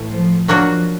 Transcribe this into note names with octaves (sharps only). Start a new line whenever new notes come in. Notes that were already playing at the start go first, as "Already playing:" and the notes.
Already playing: A2 E3 A3
F3
F3 F#3 A#3 D4 F#4